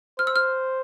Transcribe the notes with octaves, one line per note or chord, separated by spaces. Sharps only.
C5 F6
E6
F6